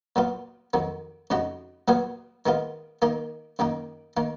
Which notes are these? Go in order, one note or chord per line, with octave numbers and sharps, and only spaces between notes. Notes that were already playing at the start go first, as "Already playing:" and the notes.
A#2 F#3 B3 F4
F2 D#3 F#3
F2 C#3 G#3 D#4 F#4
A#2 F#3 B3 F4 G#4
D#3 G#3 B3 F4
D#3 A#3 D#4
F#2 D#3 A#3 D#4
D#3 A#3